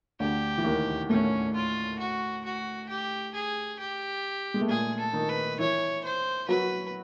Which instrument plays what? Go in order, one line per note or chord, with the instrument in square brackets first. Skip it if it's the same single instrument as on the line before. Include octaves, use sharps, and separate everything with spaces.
[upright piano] D2 D3 [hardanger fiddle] G4
[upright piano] E3
D#2 D#3
[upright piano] A2 A3 [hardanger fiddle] C#4
[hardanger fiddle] F4
F#4
F#4
G4
G#4
G4
[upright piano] G#3
A3
[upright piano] A#2 A#3 [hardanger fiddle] G#4
[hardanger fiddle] A4
[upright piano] D#3 D#4
[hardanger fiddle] B4
[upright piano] E3 E4 [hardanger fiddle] C#5
[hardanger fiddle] C5
[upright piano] F#3 F#4 [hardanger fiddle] B4